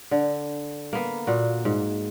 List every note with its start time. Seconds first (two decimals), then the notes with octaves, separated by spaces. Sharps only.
0.11 D3
0.93 A#3 B3
1.27 A#2 F#4
1.65 G#2